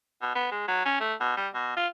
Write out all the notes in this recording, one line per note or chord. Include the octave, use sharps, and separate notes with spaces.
B2
B3
G#3
F#3
C#4
A3
B2
G3
B2
F4